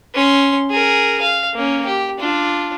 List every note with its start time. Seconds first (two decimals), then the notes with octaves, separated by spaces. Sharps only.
0.14 C#4 C6
0.70 G#4 A#4
1.21 F5
1.54 A#3 C#4
1.86 G4
2.19 D4 F4